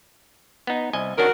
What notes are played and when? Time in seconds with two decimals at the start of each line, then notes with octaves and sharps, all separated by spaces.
0.67 B3 D#4
0.93 C2 D#5 G#5
1.18 D#3 C#4 D4 F#4 A#4